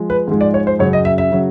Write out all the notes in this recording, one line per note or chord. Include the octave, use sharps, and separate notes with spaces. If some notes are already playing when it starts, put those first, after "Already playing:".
Already playing: F3 G#3
B4
G#2 F3 G#3
D5
C#5
C5
F#2 C#3 F#3 C#5
D#5
E5
E5
C#3 F#3